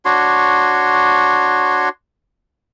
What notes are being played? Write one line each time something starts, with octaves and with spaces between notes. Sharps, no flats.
D4 F#4 C#5 C6